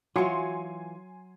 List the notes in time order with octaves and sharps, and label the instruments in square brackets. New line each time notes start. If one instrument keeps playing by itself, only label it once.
[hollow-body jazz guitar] E3 F4 [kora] F#3 [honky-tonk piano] G#5 C6 C#7